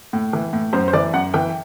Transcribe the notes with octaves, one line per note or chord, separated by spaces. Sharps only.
A2
E3
A2
F#2 C5
C5
E3 D5
F#2 F#5
E3 G5